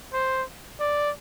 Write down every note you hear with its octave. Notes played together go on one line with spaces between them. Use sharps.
C5
D5